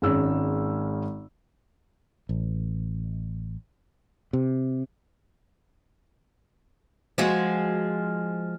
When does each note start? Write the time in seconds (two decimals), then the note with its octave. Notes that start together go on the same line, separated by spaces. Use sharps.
0.02 G#1 G#3 C#4 E6
2.29 A1
4.33 C3
7.18 F3 G#3 F#4